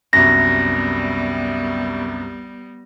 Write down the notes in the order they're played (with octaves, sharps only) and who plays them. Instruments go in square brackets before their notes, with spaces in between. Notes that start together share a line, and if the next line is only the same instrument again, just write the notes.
[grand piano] C2 F#2 [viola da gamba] G3 B3 [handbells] A#6